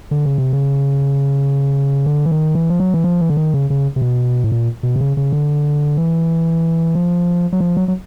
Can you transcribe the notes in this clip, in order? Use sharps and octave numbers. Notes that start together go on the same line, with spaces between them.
D3
C#3
C3
C#3
D3
E3
D#3
E3
F3
F#3
E3
F3
E3
D3
D#3
C#3
C#3
C3
B2
A2
A#2
B2
C3
C#3
C#3
D3
E3
F3
F#3
F3
F#3
F#3